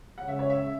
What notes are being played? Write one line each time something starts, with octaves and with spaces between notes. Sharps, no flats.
C#3 G#3 C#4 F#5
E5
C#5
E5